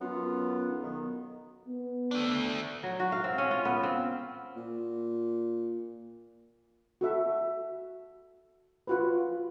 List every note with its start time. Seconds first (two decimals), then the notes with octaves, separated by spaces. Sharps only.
0.01 F#2 B3 F4
0.68 B1
0.83 D#3
1.67 B3
2.11 A3 D4
2.83 F#3
3.00 F#4
3.12 F5
3.24 C4
3.38 C#4
3.51 F4
3.65 B3
3.83 C4
4.56 A#2
7.01 F#4 A4 E5
8.87 F4 F#4 B4